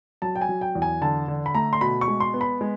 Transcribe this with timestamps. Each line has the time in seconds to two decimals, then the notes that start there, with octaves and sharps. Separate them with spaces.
0.22 F#3 A5
0.36 G5
0.41 G#5
0.49 F#3
0.61 G5
0.75 E2
0.82 G#5
1.01 D3 A5
1.28 D3
1.46 B5
1.55 A3 A#5
1.73 C6
1.81 B2 B5
2.01 C#6
2.08 G#3
2.20 C6
2.34 B3
2.41 B5
2.61 G#3